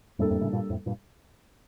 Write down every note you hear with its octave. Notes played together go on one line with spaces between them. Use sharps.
F2 A2 G3 A#3 D4 A4
F2 A2
A2 C#3
G2 A#2
F2 A2
G2 A#2